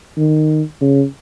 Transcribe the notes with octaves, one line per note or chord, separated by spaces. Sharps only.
D#3
C#3